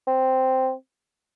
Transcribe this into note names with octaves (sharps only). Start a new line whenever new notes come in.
C4